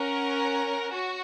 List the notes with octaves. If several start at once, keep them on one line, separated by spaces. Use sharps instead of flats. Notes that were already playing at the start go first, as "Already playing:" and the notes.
Already playing: C#4 A#4 C#5 F#5
F#4